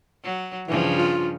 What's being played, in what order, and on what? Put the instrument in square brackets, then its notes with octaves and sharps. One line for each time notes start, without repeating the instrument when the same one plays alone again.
[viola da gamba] F#3
[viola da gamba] G2 C#3 F3 [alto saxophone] E3
[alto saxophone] F4